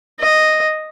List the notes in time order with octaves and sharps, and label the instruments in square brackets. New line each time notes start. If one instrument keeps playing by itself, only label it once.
[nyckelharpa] D#5